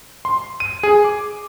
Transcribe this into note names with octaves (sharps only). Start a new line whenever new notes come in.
C6
D#7
G#4
D6